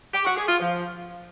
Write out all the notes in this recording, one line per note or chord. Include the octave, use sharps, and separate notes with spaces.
G4
F#4
G#4
F4
F3